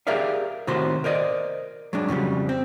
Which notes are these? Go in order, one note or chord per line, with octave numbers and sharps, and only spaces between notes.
G4 G#4 A#4 D5 E5 F5
A2 C3 D#3 F#4 C5 C6
A#4 C5 D5 D#5
F#3 G#3 D4
F2 C#3 F#3 G3
C4